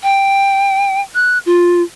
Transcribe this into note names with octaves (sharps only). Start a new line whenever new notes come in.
G5
F#6
F4